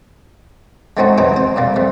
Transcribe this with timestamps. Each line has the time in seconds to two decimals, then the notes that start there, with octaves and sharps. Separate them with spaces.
0.97 G#3 A3 C4 C#4 D#4 F#4
1.18 C3 E3 F#3 D#4 C5 D6
1.36 C5
1.56 C3 G3 A#3
1.76 G3 A3